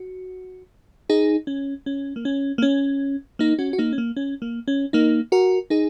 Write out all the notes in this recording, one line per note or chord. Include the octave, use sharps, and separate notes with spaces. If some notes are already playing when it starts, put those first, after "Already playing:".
Already playing: F#4
D#4 G#4
C#4
C#4
A#3
C#4
A#3
C#4
A#3 D#4
C#4 F#4
F#4
A#3 D#4
C#4
A#3
C#4
A#3
C#4
A#3 D#4
F#4 A#4
D#4 G#4